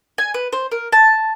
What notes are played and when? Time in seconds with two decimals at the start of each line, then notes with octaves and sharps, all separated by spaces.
0.18 G#5
0.34 B4
0.53 C5
0.71 A#4
0.92 A5